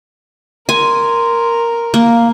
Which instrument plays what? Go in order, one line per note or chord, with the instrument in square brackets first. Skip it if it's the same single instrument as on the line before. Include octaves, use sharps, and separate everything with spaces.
[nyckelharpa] A#4 [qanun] G#5 [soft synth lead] C6
[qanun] A#3 [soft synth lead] F5